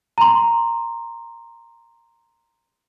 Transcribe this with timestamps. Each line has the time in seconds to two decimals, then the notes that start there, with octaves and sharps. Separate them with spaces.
0.18 A#5 C6